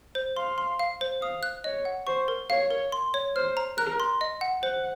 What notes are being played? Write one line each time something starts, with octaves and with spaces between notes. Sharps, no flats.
C5
F5 C6
C6
F5
C5
F5 D#6
F#6
C#5 D#5
F#5
C5 C#6
A#4
C#5 F5
A#4
C6
C#5
C5 F6
A#5
A#4 F#6
C6
D#5
F#5
C5 F#5